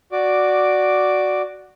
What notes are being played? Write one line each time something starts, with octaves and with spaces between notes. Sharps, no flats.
F#4 D5 D6